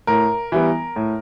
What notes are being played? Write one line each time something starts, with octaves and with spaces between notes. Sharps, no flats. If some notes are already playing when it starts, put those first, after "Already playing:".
A2 A#4
E3 G3 B3
A2